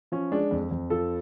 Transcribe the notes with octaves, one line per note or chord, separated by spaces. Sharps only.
F3 C#4
G#3 D4
F2
F2
F3 A4